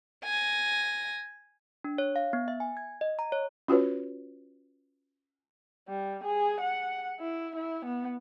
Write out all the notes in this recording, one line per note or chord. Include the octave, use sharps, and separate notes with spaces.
G#5 A#6
D4
C#5
F5
B3
E5
G#5
G#6
D#5
A#5
C#5
C#4 F4 F#4 B4 C#5
G3
G#4
F#5
E4
E4
B3